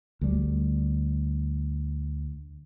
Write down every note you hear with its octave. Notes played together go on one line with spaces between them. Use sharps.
D2 G3